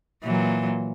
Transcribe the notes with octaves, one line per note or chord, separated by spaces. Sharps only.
A#2 E3 F#3